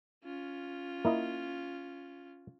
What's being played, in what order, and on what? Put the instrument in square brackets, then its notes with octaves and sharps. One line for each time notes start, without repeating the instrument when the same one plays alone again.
[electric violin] C#4 F4
[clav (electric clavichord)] A#3 E4 D#5